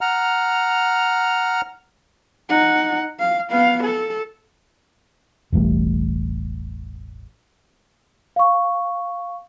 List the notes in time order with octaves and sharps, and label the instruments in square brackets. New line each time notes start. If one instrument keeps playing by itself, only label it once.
[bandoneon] F#5 A#5 F6
[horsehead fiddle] D#4 F#5
F5
B3 F5
A4
[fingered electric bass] E1 A1 A2 G3
[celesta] F5 C#6